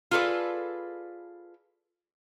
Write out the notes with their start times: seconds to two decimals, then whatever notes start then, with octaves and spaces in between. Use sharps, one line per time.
0.11 F4 G#4 A4 B4 D5